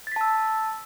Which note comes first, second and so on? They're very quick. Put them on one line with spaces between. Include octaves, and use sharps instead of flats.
A6 B6 A5 E6